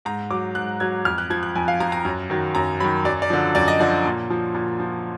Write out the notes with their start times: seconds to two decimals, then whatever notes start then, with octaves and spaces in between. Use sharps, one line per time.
0.05 G#2 A#5
0.31 F#3 D6
0.55 G#2 F#6
0.80 F#3 G#6
1.05 F2 F6
1.18 F#6
1.30 F3 G#6
1.43 F#6
1.55 F2 G#5
1.68 F5
1.80 F3 A#5
1.92 A#5
2.05 F#2
2.30 D#3 F#3
2.55 F#2 A#5
2.80 D#3 F#3 B5
3.05 F#2 D5
3.22 D5
3.30 D3 F3
3.55 F#2 D5
3.68 D#5
3.80 D3 F3 D5
4.05 A#2
4.30 F3
4.55 A#2
4.80 F3